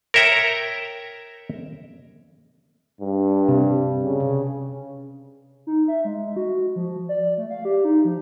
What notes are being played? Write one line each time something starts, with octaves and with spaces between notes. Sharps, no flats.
A#4 C#5 E5 G5 A#5
G2
C3
C#3
D#4
E5
G#3
F#4
F3
D5
A3
F5
G4
D#4
F3